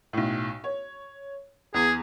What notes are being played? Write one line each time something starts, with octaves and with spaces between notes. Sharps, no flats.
B1 A2
C#5
E2 G#4